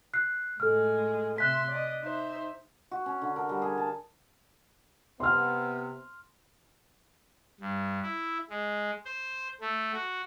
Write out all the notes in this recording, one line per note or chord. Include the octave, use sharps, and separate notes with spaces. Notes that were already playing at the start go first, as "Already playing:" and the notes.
F#6 C7
A2 G#3 A4 F6
C3 E5 C6 F#6 B6
D5 D#5
D#4 C5 E5
F#4
C#4
D3
A#4
G3
G#4
A5
C3 B3 C6 F6
G2
E4
G#3
C5
A3
F#4